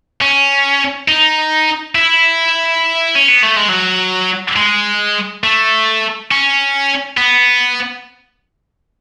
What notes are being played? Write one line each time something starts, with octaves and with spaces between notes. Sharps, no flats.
C#4
D#4
E4
C#4
B3
A3
G#3
F#3
G#3
A3
C#4
B3